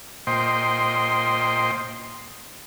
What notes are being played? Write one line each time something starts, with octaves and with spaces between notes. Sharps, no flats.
A#2 C5 D#5 G5 C6